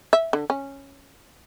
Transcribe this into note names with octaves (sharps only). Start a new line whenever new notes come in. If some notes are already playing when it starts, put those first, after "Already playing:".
E5
D3
C#4